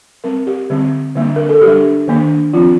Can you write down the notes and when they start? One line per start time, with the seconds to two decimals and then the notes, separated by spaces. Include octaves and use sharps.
0.24 G3 C4 A#4
0.47 G4
0.70 D3 G3 C4
1.16 D3 G3 A#3 D4
1.36 A#4
1.49 A4
1.62 G3 D4 G4
2.07 D#3 A#3 D4
2.53 F3 C4 F4